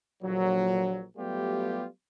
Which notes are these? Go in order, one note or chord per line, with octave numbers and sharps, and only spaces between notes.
A#1 A#2 D3 F#3
F#3 G3 A3 B3 F4 G4